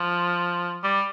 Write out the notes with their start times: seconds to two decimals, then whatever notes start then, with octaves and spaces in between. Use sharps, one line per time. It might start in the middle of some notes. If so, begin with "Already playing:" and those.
Already playing: F3
0.83 G3